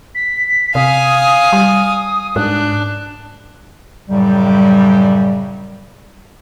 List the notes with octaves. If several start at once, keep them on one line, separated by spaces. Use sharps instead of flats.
B6
C3 F5 G#5 D#6
G3
G#2 D4 F#6
F#2 A2 C#3 F#3 G3